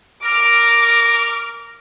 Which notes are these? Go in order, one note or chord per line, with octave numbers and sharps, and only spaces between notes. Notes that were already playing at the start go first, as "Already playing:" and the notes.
A#4 D6